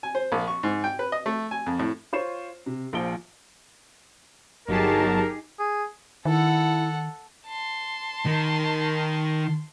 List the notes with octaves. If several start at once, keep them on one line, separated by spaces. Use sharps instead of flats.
G#5
C5
A#1
C#6
G#2
G5
B4
D#5
A3
G#5
F2
A2
F4 C5 C#5 C#6 C7 E7
C3
A#1 F3 D7 G7
G1 F#3 D#4 G4 G#4 A#4 A5
G#4
D#3 E4 A4 F#5
A5 C6
D#3